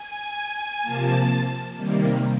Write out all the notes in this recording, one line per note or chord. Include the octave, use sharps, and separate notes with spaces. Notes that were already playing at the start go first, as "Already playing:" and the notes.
Already playing: G#5
C3 F3 A#3 A5
C3 D#3 G3 A#3